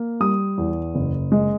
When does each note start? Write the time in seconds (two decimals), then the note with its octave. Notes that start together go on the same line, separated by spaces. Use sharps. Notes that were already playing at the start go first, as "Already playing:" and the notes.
Already playing: A#3
0.20 G3 D#6
0.58 E2
0.95 F#1
1.32 G#3